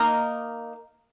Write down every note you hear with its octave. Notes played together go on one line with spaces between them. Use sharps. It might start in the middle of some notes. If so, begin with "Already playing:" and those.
Already playing: A#3 D#4 A#4 D#5